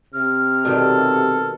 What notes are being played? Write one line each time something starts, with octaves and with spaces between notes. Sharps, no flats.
C3 F6
B2 D#3 G3 A4